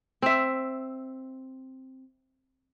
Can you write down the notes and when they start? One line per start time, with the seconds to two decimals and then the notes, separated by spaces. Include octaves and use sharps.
0.22 C4 E5